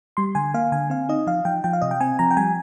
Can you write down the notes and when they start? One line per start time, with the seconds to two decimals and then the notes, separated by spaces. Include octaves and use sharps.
0.17 G3 C6
0.35 D3 G#5
0.54 A#3 F5
0.72 D3 G#5
0.90 C4 F5
1.09 D#4 D#5
1.27 F3 F5
1.45 F3 G5
1.64 F3 G5
1.73 F5
1.82 C3 D#5
1.91 G5
2.00 C4 G#5
2.19 F3 A#5
2.31 G5
2.37 G3 G#5